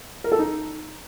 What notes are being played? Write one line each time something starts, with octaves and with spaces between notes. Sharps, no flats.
A#4
A4
D#4